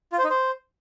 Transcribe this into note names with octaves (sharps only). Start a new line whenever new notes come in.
F4
C5
D#4
C5